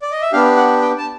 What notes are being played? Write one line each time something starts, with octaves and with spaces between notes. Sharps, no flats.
D5
D#5
E5
B3 D4 G4 F5
F#5
G5
A5